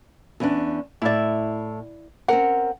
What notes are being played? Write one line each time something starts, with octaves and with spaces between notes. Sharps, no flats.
E2 C#4 D4
A2 E4 D5 E5
C4 C#4 A#4 F#5